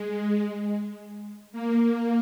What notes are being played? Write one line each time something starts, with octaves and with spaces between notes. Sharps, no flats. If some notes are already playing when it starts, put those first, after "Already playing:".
Already playing: G#3
A#3